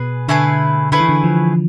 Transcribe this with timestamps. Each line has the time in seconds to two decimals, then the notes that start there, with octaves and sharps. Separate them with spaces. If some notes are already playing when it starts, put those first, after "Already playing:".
Already playing: B2 G#4 B4
0.28 D3 A3 E4 G#4 B4
0.92 D3 A3 E4 G#4 B4
1.00 E3
1.09 D3
1.24 F3